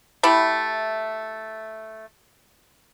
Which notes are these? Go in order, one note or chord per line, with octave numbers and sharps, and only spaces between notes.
A3 E4 G4